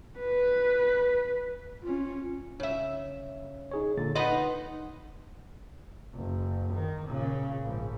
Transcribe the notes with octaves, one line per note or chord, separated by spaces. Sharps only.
B4
C#4 F4
C#3 E5
D#4 G#4 C#5
A#2 D3 A6
D#4 B4 D#5 F#5 B5 C6
F#1
D#3
A#2 C#3
A#1 G#2